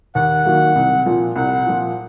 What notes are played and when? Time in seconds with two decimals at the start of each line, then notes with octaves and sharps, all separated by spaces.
0.15 D#2 F#5
0.45 D#3 F#3 A#3
0.76 C2
1.06 A#2 F3
1.36 C2 F#5
1.66 A#2 F3